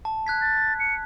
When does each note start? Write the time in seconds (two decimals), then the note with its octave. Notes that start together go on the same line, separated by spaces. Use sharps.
0.05 A5
0.27 F#6 G#6 B6
0.41 A6
0.80 C#7